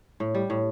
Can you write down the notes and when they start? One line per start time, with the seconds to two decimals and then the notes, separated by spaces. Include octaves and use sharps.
0.20 A2
0.35 G3
0.50 A2